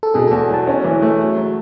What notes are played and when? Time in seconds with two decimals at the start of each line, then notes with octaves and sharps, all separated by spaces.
0.03 A4
0.14 B2 G#4
0.27 E2 A4
0.50 F#3 A5
0.67 C#4
0.84 E3
1.02 A3
1.20 F#3
1.37 F#3